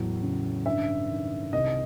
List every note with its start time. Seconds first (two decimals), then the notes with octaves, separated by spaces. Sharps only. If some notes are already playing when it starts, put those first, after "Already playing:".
Already playing: E2 A2 F#3
0.23 C#3
0.66 G2 E5
1.10 D#3
1.53 C2 D#5